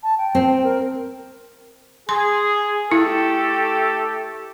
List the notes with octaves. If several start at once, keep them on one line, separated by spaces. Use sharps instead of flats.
A5
G5
C4
A#4
G#4 C6
A3 E4 G4 A4